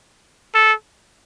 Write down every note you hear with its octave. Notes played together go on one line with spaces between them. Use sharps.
A4